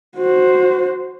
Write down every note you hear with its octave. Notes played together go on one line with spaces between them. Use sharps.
F#4 C5